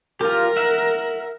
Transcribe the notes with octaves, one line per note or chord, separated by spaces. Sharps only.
F4 G4 A#4
E5 F#5